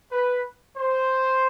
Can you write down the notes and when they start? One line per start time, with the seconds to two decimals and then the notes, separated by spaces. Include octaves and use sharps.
0.11 B4
0.77 C5